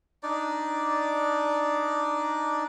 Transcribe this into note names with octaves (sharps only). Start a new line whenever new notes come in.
D4 D#4 D5